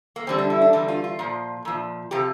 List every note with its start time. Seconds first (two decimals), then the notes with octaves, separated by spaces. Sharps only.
0.16 A#3
0.27 E2 D3 G3 C4
0.38 D4
0.50 E4
0.62 D4
0.73 E2 D3 G3 D4
0.88 F4
1.04 F4
1.19 A#2 F3
1.65 A#2 F3
2.11 C3 F3 G4